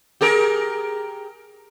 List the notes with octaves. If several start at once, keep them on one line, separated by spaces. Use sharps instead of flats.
G4 G#4 A#4